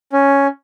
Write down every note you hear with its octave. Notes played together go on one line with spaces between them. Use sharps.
C#4